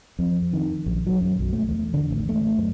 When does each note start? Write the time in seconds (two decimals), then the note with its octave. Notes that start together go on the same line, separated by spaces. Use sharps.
0.19 F2
0.53 D#3
0.86 A#1
1.07 F#3
1.21 F#2
1.39 B1
1.53 A3
1.69 E2
1.94 D3
2.11 A1
2.29 A3
2.58 F#2